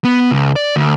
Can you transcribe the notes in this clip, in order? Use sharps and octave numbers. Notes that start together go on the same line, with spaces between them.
B3
C#2
D5
D2